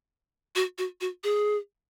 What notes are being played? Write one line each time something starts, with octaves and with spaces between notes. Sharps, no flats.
F#4
F#4
F#4
G#4